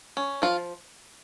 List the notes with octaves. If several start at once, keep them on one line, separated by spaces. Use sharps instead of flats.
C#4
F3 F4